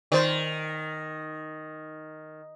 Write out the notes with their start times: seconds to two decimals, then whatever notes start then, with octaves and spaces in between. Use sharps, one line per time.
0.12 D#3 C5 D5